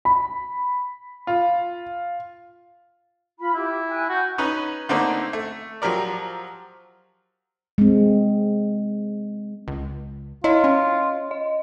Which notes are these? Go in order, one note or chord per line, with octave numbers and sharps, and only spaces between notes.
B5
F4
F4 B5
E4 G4
G5 G#5 F#6
F#4 G6
C#4 D#4 B4 A#5
D3 A3 A#3 C4 D4 D#4
A3
F3 F#3 G4 A#4 D5
G#3 C4
C#2
E4 F4 C#5 D#5
C#4
D#5